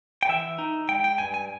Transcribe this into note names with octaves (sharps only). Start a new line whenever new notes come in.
G5
E3 E5
D#4
G#3 G5
G5
G2 G#5
G#5